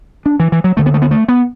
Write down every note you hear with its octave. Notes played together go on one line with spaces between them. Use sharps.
D4
E3
E3
F#3
D2 D3 A3
B3
A3
B3
A3
B3